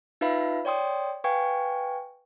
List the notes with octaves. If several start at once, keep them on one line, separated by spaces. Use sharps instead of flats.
D#4 F4 B4 E5 F5 B5
C#5 D5 G5 C6 D#6
B4 F5 G5 G#5 C#6 G#6